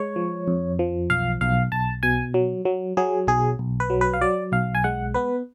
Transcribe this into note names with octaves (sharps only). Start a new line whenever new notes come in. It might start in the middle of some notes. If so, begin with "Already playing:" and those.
Already playing: G#3 C#5
F3
F2
F3
B1 F5
B1 F5
B1 A5
B2 G#5
F#3
F#3
F#3 G#4
B1 G#4
B1
B4
F#3
B4
F5
F#3 D5
B1 F5
G#5
G#3 F#5
B3 B4